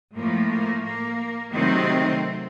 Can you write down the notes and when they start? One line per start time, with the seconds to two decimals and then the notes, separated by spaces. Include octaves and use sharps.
0.15 A2 F3 A3 A#3
0.49 A#3
0.84 A#3
1.52 C3 D#3 F#3 A3 C4